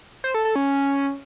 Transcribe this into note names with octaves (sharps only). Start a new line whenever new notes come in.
C5
A4
A4
C#4